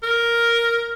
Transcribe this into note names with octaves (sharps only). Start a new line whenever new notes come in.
A#4